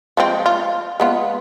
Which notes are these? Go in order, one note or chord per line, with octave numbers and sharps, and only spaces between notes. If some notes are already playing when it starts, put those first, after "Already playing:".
F3 G#3 C4
F4
G#3 B3 F4